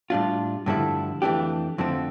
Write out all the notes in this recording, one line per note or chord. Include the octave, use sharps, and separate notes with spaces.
A2 G3 D4 F4
G2 D3 F3 A3 E4
F2 E3 A3 D4 G4
F2 D3 F3 A3 C4